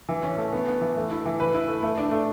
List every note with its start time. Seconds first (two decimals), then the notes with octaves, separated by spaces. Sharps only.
0.09 E3
0.23 C#4
0.38 A3
0.53 B3
0.67 B3
0.81 E3
0.96 A3
1.11 E4
1.25 E3
1.40 B4
1.54 E4
1.68 A3
1.83 A3
1.97 D4
2.11 A3